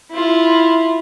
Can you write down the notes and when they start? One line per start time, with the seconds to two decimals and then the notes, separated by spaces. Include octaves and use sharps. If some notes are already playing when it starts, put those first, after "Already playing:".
0.11 E4 F4